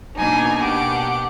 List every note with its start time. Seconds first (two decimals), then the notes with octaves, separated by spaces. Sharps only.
0.17 B2 A#3 D4 D#4 G#5
0.63 G4 F#5 D6